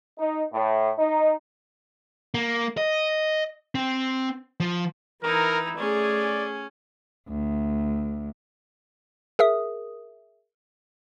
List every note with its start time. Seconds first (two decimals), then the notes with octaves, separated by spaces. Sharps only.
0.18 D#4
0.53 A2
0.98 D#4
2.34 A#3
2.77 D#5
3.75 C4
4.60 F3
5.23 E3 D#4 E4 A#4
5.78 A3 C#4 G#4 D5
7.29 D2
9.39 G#4 A#4 E5 D#6